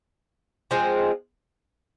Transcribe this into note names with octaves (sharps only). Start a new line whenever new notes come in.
F3 G#3 C4